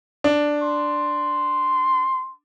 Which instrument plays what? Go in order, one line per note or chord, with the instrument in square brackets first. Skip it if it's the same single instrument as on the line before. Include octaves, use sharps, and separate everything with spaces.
[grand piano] D4
[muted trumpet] C6